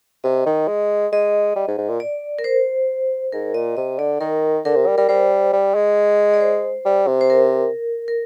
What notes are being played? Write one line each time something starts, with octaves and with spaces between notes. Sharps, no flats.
C3 D#5
D#3
G#3
G#3 D#5
G3
G#2
G#2
A#2
D5
A#4
C5
G#2 A#4
A#2 D#5
C3 D#5
D3 D5
D#3 A#4
D3 A#4
C3
G3
G3 A#4
G3 C5
G3
G#3
D5
C5
G3
C3
C5
A#4
A#4